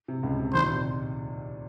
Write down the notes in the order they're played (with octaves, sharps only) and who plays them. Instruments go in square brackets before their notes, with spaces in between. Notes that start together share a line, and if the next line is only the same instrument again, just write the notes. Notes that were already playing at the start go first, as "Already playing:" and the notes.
[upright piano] C3
C#2 C#3
C3
[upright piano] D#2 D#3 [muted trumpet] C5
[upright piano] A#2
C3